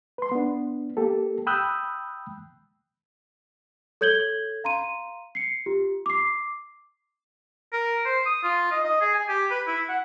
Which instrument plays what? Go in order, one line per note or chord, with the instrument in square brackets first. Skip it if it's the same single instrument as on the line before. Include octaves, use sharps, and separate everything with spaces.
[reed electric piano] B4 C6
B3 D4
A#3 G4 A4
G5 B5 D#6 E6 F#6 G6
[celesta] A4 C#5 G6 G#6 F#7 G7
F5 A#5 C6 D#7
C7 C#7
F4 G4
D6 C7
[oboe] A#4
C5
D#6
F4
D#5
D#5
G#4
G#5
G4
B4
E4
F#5